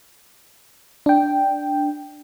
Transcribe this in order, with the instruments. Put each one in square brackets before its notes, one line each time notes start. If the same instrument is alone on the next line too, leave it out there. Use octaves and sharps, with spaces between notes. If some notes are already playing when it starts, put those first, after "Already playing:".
[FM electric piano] D4 G5